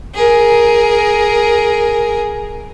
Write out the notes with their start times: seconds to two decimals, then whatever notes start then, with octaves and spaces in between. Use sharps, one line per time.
0.15 G#4 A#4